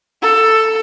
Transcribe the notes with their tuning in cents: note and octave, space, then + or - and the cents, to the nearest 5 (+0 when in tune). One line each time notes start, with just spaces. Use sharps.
A4 +10